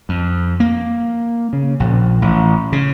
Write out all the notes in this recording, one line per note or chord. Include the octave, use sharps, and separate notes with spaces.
F2
A#3
C#3
A#1
A1
C#3